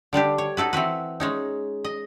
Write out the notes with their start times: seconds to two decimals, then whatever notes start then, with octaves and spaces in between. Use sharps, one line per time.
0.13 D3 G3 D4 G4
0.38 C#5
0.57 D#4 F#4 A4 B4
0.73 E3 C4 F#4 B4
1.20 G#3 C#4 D#4
1.84 D#5